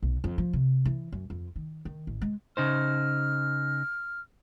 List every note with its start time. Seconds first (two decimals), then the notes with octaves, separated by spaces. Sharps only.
0.03 B1
0.24 F2
0.38 F3
0.53 C3
0.85 E3
1.12 F#2
1.30 F2
1.56 D#3
1.85 D#3
2.07 A1
2.22 G#3
2.57 C#3 D#4 C5 F6